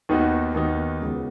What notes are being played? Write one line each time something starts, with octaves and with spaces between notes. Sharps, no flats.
D#2 D#3 B3 D#4 F#4
D#2 D#3 B3 D#4 F#4
C#2 C#3 B3 F#4